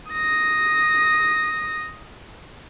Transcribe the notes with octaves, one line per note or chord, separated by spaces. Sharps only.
D#6 A#6